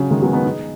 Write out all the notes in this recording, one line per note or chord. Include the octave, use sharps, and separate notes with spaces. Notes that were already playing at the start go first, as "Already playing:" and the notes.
Already playing: C#3 F#3
D#3 G#3
F#3 B3
B3 D#4
D#4 G#4